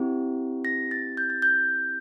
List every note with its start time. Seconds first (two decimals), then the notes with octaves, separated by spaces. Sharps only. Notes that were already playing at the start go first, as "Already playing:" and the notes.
Already playing: C4 E4 G4
0.65 A#6
0.91 A6
1.17 G6
1.30 A6
1.42 G6